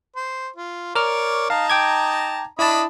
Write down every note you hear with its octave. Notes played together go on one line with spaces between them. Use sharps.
C5
F4
A#4 C#5 D5 F6
D#4 F5 A5 A#5
G5 D6 G#6
D4 E4 D#5 A5 B5